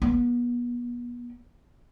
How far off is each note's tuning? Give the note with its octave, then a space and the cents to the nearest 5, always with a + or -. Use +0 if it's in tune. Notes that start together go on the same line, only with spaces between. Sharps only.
B3 -35